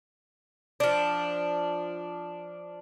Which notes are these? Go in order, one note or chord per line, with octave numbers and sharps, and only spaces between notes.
F3 D4